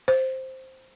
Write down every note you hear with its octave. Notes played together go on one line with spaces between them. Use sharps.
C5